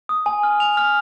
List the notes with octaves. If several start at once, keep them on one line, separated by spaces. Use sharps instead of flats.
D#6
G#5
F6
F7
F6